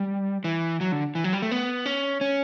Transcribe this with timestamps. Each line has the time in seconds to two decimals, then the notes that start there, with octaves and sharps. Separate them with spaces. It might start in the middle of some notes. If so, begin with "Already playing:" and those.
Already playing: G3
0.44 E3
0.81 F#3
0.92 D3
1.15 E3
1.24 F#3
1.33 G3
1.42 A3
1.51 B3
1.86 C#4
2.21 C#4